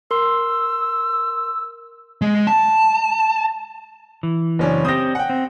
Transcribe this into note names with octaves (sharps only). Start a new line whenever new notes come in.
A#4 C6 E6
G#3
A5
E3
F#1 C#4 D4
C4 G4 D#6 A#6
F#5 G5
C4